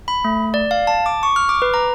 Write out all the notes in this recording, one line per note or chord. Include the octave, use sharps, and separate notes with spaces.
B5
A3
D5
F5
A5
D6
C#6
F6
D6
B4
A#5